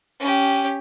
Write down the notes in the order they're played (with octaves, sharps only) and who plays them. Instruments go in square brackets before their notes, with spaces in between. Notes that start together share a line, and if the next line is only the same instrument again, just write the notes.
[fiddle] C#4 G4